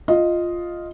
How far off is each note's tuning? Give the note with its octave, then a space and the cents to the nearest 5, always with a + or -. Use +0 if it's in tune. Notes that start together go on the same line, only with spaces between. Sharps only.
F4 +0 D#5 +0